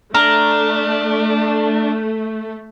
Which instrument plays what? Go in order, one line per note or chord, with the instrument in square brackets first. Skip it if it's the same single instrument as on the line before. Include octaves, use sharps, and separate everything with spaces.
[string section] A3 [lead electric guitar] D4 [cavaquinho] A#5 [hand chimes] F6